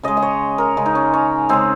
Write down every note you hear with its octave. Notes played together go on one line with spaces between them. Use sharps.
C#3 G#3 D#5
D#5
C#5
A#4
C#3 G#3
D#4
C#4
C#4
C#3 G#3 C4